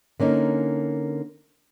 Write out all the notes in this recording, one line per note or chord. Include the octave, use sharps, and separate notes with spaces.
D3 A#3 C#4 D#4